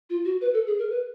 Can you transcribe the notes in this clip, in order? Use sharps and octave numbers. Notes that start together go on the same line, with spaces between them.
F4
F#4
B4
A4
G#4
A#4
B4